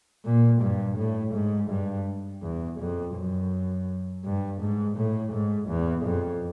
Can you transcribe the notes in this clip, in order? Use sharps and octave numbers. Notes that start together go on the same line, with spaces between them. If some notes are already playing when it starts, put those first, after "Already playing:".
A#2
G2
A2
G#2
G2
E2
F2
F#2
G2
G#2
A2
G#2
E2
F2